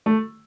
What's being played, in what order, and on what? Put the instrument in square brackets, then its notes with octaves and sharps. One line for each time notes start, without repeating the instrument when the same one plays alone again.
[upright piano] A3